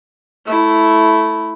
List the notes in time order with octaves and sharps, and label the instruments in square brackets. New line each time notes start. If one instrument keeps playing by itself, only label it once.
[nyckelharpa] A3 E4